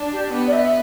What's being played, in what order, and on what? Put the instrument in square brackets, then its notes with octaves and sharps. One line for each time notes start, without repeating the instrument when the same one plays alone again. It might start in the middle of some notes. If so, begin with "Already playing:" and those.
Already playing: [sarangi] D4
[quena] G4
[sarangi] B3
[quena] D5
E5